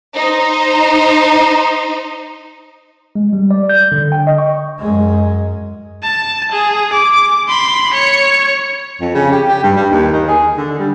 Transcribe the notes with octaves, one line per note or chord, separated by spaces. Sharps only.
D#4 C5
G#3
G3
D5
G6
D3
G5
D#5
C#6
F#2 G#3
A5
G#4
D6
B5 C6
C#5 C#7
F2
C#3
G4
G4
G2
G3
D#2
D#3
G#4
D3
G3